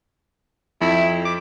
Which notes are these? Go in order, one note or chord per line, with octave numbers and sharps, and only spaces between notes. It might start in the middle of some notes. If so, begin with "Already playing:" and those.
F2 E4
D6